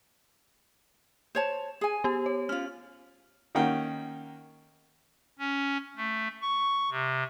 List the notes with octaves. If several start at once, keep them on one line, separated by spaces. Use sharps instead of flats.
C5 C#5 A5
G#4 G#5
B3 G4
C#5
C#4 F4 F6
D#3 A#3 C#4 F#5 G5
C#4
A3
C#6
C3